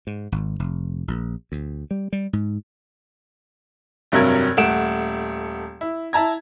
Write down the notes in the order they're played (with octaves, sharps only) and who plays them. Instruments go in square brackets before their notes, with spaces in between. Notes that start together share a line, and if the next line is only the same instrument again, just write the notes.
[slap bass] G#2
G#1
F1
A#1
D2
G3
G3
G#2
[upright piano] F1 G2 C3 F#3 A#4 G#6
D#1 A3 F#5 D7 E7
E4
E4 A5 A#5 G#6